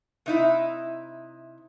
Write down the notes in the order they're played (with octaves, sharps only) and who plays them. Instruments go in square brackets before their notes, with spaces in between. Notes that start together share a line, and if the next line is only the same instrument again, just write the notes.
[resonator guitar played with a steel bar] C3 D#4 E4